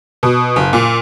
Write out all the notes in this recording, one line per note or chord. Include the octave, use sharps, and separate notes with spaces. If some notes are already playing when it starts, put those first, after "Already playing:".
B2
F#1
A#2